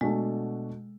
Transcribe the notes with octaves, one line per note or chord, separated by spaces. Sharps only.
B2 G#3 A3 D4 F#4 A4